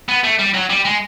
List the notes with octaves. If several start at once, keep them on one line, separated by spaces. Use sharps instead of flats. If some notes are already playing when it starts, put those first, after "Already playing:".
B3
A3
G3
F#3
G3
G#3